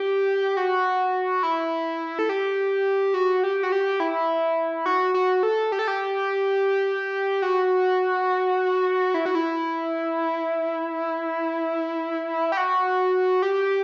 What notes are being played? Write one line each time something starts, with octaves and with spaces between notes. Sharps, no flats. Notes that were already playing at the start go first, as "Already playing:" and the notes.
Already playing: G4
F#4
E4
A4
G4
F#4
G4
F#4
G4
E4
F#4
F#4
A4
G4
A4
G4
F#4
E4
F#4
E4
G4
F#4
G4